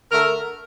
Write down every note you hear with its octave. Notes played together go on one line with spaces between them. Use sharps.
D3 A3 A#4